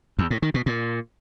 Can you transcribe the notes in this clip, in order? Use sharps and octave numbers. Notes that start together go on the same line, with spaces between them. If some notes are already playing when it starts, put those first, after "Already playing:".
E2
A2
D#3
B2
A#2